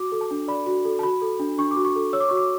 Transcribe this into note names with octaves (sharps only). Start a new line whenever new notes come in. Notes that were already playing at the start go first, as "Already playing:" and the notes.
Already playing: F#4 D6
A4
A5
D4
D5 B5
F#4
A4
A5
F#4 B5
A4
D4
D4 C#6
D6
F#4
C#6
A4
C#5 E6
D6
F#4 C#6
D6